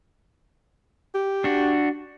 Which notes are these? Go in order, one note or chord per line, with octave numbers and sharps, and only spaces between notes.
G4
D4 F#4